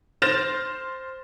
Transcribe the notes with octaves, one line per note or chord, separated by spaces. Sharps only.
C5 F6 G6 A6 A#6 E7